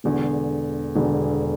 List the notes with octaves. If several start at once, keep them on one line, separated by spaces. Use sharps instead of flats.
E1 E2 D3
E1 E2 D3